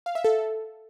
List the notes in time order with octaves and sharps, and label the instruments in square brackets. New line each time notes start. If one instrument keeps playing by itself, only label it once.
[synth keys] F5
E5
A4